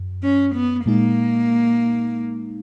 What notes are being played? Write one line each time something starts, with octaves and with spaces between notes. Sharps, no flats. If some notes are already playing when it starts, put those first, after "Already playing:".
Already playing: F#2
C#4
B3
A#2 G#3 A#3 D#4